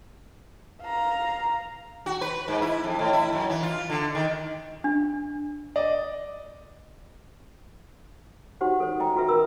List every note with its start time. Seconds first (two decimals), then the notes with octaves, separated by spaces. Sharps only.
0.82 F5 A#5
2.06 F#4
2.21 B4
2.48 G#2
2.62 E4
2.84 F2
2.99 A2
3.13 E4
3.33 F#2
3.50 E3
3.63 F4
3.90 D3
4.15 D#3
4.84 D4
5.76 D5 D#5
8.61 D#4 F#4 G4 C5 F#5
8.80 A4 C5
9.00 D#5 G5 A#5
9.16 F4 F#4 A4 B4 E5
9.29 F4 A#4 B5 E6